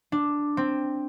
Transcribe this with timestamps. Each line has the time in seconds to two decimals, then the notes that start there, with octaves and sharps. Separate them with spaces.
0.12 D4
0.57 C4